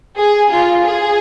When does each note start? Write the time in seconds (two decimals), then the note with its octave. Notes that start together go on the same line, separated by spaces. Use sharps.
0.18 G#4
0.52 F4
0.86 G#4